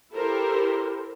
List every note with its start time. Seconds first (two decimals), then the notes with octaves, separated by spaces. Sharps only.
0.13 E4 G4 A4 A#4 C5